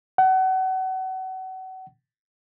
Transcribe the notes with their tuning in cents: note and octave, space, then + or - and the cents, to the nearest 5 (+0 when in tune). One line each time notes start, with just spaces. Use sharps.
F#5 +30